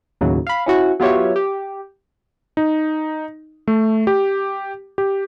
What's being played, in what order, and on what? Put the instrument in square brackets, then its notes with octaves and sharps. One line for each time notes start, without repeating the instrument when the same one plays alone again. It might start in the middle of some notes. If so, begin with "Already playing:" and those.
[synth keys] D#2 A2 C#3 F#3
F5 B5
C#4 E4 F#4
F#3 B3 F4 G4 C#5 E5
G4
[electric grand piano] D#4
A3
G4
G4